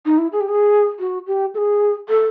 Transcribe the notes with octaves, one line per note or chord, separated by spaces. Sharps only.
D#4
E4
G#4
G4
G#4
F#4
G4
A4
G#4
A4